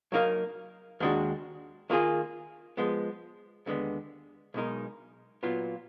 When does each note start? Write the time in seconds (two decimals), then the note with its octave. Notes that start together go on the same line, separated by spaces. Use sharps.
0.12 F#3 A#3 D#4 A#4 F5
1.00 D#2 D#3 G#3 D4 F#4
1.90 D#3 A#3 F4 G#4
2.77 F3 G#3 B3
3.66 D#2 D3 G#3 B3
4.54 B1 B2 G#3 D#4 A#4
5.43 A#2 F#3 B3 F4